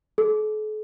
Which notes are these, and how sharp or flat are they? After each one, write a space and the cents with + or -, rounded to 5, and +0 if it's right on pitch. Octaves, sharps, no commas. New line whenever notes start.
A4 -45